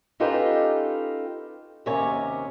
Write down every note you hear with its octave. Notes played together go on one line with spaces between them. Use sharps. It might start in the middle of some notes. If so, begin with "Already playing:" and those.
C#4 D#4 F4 G4 A4 B4
D#2 C3 C#4 A#4 C#5